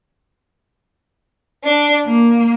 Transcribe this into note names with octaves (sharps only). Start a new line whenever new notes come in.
D4
A#3